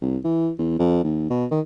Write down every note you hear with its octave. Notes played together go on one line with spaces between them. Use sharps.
C2
E3
E2
F2
D#2
B2
D#3